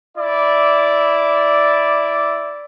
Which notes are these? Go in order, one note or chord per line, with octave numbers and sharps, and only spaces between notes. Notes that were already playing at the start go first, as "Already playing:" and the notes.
E4 D5